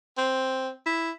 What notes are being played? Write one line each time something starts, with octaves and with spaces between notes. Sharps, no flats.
C4
E4